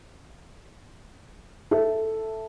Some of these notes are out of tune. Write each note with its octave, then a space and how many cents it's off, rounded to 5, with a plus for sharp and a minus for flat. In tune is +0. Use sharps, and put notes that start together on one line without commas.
A4 +0 E5 +0